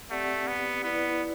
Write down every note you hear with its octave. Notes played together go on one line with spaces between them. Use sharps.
A3 C4 G4 D5 F#5
B3
B3 E4 B4 D5